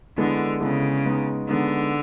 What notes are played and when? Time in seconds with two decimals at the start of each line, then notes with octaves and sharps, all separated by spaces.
0.18 D3 G#3 B3 E4 A4
0.60 C#3 G#3 B3 E4 A4
1.05 G#3 B3 D#4
1.48 D3 G#3 B3 D#4